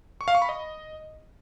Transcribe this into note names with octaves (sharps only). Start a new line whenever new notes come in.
C#6
F5
C#6
B5
D#5